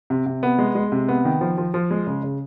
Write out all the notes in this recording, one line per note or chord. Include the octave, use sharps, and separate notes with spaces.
C3
C3
B3
G#3
G#3
C3
B3
D#3
F3
F3
F3
G#3
C#3
C#3